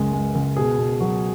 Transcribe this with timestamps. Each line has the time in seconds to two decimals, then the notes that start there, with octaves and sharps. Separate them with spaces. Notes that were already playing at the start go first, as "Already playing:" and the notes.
Already playing: C#2 F#2 G#3
0.13 G#3
0.35 C#2
0.57 B2 G#4
0.78 B2
1.00 F#3 F#4